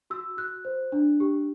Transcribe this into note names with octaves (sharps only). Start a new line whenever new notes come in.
F#4 E6
F#4 F#6
C5
D4
G4